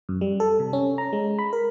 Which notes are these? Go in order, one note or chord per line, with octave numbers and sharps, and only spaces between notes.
F#2
G3
A4
C3
C#4
A#5
G#3
B5
A#4